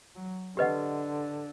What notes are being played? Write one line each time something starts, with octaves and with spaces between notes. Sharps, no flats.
F#3
D3 G4 B4 D#5 F#5